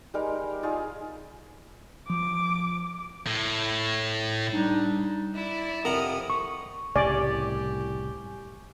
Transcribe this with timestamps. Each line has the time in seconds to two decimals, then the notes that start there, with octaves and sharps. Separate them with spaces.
0.14 G3 G#3 D#4 A#4
0.63 D#4 F4 G#4
2.10 F3 D6
3.27 A2
4.53 G3 D4 D#4
5.35 E4 D5
5.85 F2 C3 A#4 F#5 D#6
6.30 C#6
6.96 C2 A2 C#3 G4 D5 G#5 C#6